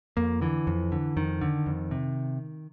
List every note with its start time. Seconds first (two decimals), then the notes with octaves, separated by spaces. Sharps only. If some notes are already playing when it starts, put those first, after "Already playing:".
0.17 F2 A#3
0.41 D3 E3
0.67 F2
0.92 D3
1.16 F2 D#3
1.41 D3
1.66 F2
1.91 C3